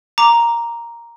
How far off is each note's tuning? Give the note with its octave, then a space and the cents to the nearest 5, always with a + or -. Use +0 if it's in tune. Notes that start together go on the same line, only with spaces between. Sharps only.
A#5 +0 D6 +0